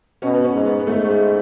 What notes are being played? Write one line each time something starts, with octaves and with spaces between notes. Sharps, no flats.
B2 C#4
B3
C#4
G#2
B3
B3
G#2 A3
G#3